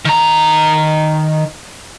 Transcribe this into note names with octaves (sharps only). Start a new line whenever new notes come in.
D#3 A#5